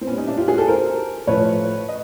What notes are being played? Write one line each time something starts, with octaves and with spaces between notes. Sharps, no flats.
C4
A#2 G3 B3 C#4
C#4 D#4
D4 E4
F4 G4
F#4 G#4
G4 A4
A#4 C5
A2 F3 A3 B4 C#5
D#5